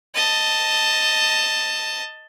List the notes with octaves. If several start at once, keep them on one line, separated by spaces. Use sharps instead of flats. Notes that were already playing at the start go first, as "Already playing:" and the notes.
D#5 A5